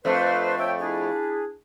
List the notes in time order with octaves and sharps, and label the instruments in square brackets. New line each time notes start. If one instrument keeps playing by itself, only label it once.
[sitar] F2 A3 [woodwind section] D4 B4 C5
[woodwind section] C#5 E5 G5
D4 E4 G#4